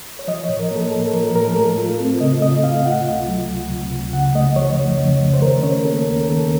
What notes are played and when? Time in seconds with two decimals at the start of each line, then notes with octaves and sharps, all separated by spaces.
0.19 C#5
0.28 F3 D#5
0.44 A2 C#5
0.59 A#4
0.71 A#3 A4
0.92 A2 A4
1.13 F3 A#4
1.35 A2 A#4
1.47 A#4
1.56 A3 A4
1.78 F4
2.00 C4
2.20 C#3 D#5
2.41 A3 D#5
2.63 F4 F5
2.85 C3 F#5
3.07 C#2
3.28 F#3
3.49 C#2
3.70 C3
3.92 C#2
4.13 C#3 F#5
4.34 A3 D#5
4.56 F3 C#5
4.78 F2
4.99 C#3
5.20 A3
5.34 C5
5.41 D#3 A#4
5.63 C#4 C#5
5.84 A#3 A4
6.06 D#2 A#4
6.27 D#3 A4